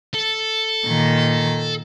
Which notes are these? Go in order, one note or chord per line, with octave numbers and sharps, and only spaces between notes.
A4
A#2 D#3